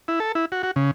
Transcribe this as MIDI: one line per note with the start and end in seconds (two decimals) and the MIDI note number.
0.08 0.20 64
0.20 0.32 69
0.35 0.45 64
0.52 0.62 66
0.63 0.71 66
0.76 0.91 49